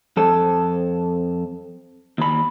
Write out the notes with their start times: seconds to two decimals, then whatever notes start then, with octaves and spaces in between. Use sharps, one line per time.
0.17 F2 A4
2.18 D#2 B5